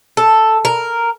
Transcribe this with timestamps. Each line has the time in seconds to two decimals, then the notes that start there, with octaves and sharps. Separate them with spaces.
0.17 A4
0.65 A#4